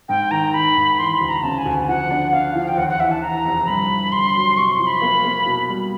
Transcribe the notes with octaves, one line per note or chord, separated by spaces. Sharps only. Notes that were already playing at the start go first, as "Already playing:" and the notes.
G#2 G5
D#3 A#5
D#3 B5
G#2
E3 C6
B5
D2
A#5
C#3 A5
G#5
D2
F3 F#5
D4
D4 F5
F3 F5
G5
D#2 F#5
F#5
E3 E5
A5
E3 A#5
F1
G2 B5
G2
D3 C6
F#3
C3 C#6
C6
F3
B5
A#3
A#3
B2
G3